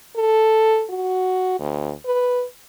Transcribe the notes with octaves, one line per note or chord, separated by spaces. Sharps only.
A4
F#4
D2
B4